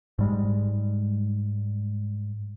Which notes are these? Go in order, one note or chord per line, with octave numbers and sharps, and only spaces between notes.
G#2 G3 G#3